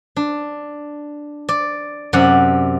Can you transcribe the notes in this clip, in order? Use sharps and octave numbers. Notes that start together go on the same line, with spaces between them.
D4
D5
F#2 C3 D5 F#5